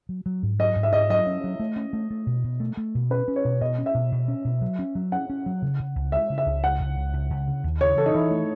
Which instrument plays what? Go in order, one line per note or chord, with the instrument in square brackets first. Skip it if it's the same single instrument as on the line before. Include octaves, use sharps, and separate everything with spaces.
[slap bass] F#3
F#3
G#2
[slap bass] F#3 [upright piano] D#5
[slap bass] G#2
[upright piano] E5
[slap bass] G#2 [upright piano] D#5
[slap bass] F#3 [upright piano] D#5
[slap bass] C#4
F#3
A3
C#4
A3
A3
B2
B2
A3
A3
B2
[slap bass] C#4 [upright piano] B4
[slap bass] C#4
[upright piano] C#5
[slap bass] B2
[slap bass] B2 [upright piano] D#5
[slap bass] C#4
[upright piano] E5
[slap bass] B2
B2
C#4
B2
F#3
C#4
F#3
[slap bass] C#4 [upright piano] F#5
[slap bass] C#4
F#3
C#3
C#3
C#2
[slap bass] G#3 [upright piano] E5
[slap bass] C#3
[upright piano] E5
[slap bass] C#2
[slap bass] C#2 [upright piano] F#5
[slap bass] C#2
C#2
C#2
C#2
C#3
D#2
[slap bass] C#3 [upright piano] C#5
[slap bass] E3 [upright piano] A4
[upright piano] D#4
[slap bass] E3 [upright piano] E4
[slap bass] A3